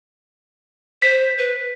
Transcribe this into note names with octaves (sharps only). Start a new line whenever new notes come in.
C5 B6
B4